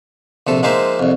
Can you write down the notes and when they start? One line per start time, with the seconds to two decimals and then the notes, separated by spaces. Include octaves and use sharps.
0.47 A#1 C3 A4
0.63 F3 G#3 A#3 D#4 C5 E5
0.99 C2 F2